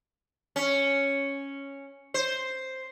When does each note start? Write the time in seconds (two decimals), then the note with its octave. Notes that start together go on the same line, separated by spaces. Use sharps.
0.56 C#4
2.14 C5